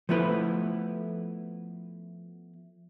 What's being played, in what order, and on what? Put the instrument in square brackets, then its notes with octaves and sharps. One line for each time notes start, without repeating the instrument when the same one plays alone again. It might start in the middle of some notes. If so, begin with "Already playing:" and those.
[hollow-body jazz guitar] F3 A3 B3 E4 B4